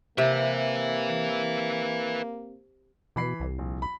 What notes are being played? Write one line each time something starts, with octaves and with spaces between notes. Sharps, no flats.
C3 A#3 B4 E5
B2 E3 B5 C7
C2
A#1
B5